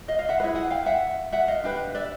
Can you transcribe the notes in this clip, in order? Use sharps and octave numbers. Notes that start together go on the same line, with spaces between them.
D#5 F5
D#5 F5
E5 F#5
E4 G#4 B4
F#5 G#5
F5 G5
E5 F#5
E5 F#5
D#5 F5
D4 G4 B4
D5 E5